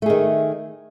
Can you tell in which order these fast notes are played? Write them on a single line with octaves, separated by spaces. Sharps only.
A3 G#4 D#3